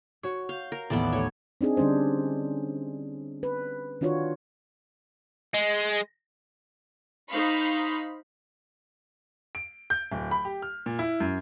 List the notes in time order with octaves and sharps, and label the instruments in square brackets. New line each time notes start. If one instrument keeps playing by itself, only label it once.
[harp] F#4 C#5
[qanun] F5 [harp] G6
[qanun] A#4
[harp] A1 D#2 [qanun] B3 A4 D5
[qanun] A3 C#5
[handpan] C4 D4 D#4 G#4
D3 G3 C#4 D4 C5
B4
D#3 D4 F4 F#4 C#5
[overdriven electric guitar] G#3
[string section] D#4 C5 F5 B5 C#6
[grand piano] D7
G6
D1
B5
G4
F6
A#2
E4
F#2